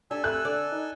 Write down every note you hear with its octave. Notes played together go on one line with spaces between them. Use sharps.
D4 G4 A4 G#5 E6
A3 F#6
D3 D5
D#4